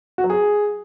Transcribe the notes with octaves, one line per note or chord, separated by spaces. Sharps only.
F#4
F#3
G#4